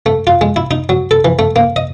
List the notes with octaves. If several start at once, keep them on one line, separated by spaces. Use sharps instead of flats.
A3
F4
G#3
E4
D#4
F#3
A4
E3
A3
A#3
D#5